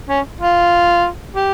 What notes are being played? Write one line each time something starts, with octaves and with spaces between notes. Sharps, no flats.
C#4
F4
G4